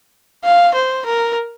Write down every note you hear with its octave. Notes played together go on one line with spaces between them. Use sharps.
F5
C5
A#4